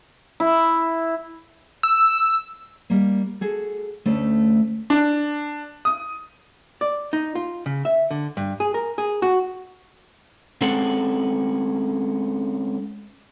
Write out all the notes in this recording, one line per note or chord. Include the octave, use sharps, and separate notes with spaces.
E4
E6
G3 A#3
F#4 G#4 A4
D2 A3 C#4 A4
D4
D#6
D5
D#4
F4
C#3
E5
D3
G2
G#4
A#4
G#4
F#4
G#3 C4 C#4 A4 F#5